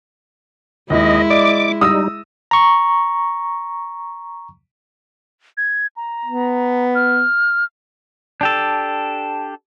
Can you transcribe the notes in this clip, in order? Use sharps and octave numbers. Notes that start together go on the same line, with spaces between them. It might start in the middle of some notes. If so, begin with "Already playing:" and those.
D#2 G#3 E4 D#5
D5 D#5 D6
G3 D#4 D#6 E6 A#6
A#5 C#6
G#6
A#5
B3
F6
D4 G4 A4